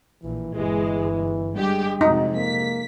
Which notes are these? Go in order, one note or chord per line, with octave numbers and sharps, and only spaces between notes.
A#1 A#2 E3
G1 E3 G#3
G2 G#3 G4
F2 C3 G#3 D#4 F#4
A#3 B6